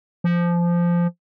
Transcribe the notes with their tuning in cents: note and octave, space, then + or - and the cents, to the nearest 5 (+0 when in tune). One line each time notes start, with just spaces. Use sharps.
F3 -15